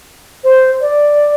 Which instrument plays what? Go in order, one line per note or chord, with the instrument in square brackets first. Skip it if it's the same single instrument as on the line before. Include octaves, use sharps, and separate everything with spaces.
[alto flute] C5
D5